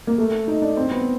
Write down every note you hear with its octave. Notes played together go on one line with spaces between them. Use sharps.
A#3
A3
D#4
D4
C4
B3